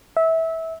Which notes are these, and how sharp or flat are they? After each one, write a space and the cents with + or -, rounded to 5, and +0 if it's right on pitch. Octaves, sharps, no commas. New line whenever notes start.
E5 -20